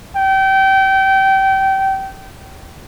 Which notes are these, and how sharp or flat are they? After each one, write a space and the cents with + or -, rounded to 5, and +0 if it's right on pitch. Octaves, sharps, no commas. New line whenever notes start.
G5 -25